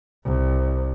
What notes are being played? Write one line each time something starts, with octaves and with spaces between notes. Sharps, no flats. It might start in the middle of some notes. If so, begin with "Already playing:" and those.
C2